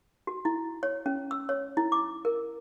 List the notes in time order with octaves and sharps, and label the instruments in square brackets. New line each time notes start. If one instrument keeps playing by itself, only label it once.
[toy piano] F#4
E4
C#5
C#4
E6
C#5
E4
D6
A#4